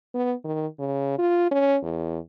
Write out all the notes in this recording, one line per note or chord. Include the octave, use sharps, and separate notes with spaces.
B3
D#3
C#3
F4
C#4
E2